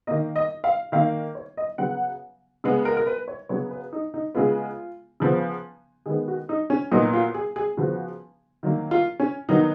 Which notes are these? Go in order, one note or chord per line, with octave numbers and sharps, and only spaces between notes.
D#3 A#3 D#5
D#5
F5
D#3 A#3 F5
C#5
D#5
C#3 F#3 B3 F#5
C#3 G#3 B3
A#4
A#4
B4
C#5
C#3 F#3 B3 C#5
B4
D#4
D#4
C#3 G#3 B3 F4
C#3 F3 B3
D#3 G#3 B3 G#4
F#4
D#4
C#4
A#2 F#3 B3 D#4
F4
G#4
G#4
C#3 F3 B3 F#4
D#3 F#3 A#3
F4
C#4
D#3 F#3 B3 D#4